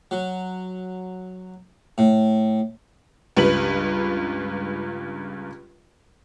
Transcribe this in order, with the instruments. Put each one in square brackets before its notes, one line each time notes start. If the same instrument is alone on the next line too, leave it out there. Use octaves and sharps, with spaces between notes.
[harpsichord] F#3
A2
[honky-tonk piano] C#2 G2 B4 F#7